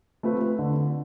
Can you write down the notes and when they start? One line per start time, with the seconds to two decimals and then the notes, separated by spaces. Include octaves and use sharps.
0.23 A3 C4 F4 B4
0.59 D3